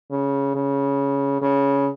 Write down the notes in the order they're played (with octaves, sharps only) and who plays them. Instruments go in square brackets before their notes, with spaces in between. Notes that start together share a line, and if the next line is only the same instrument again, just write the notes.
[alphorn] C#3
C#3
C#3